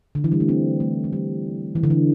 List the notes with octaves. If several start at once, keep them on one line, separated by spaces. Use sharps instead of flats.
D3
E3
G3
A3
C4
A3
A3
G3
E3
D3
E3